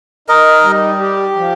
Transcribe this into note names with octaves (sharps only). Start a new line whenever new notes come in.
D#4 A#4 D#5
G3
G4
F3